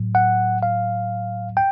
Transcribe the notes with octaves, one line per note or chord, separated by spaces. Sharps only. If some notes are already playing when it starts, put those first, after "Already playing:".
Already playing: A2 F#3
F#5
F5
G5